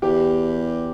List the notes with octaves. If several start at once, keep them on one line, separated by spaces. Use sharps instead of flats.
E2 G4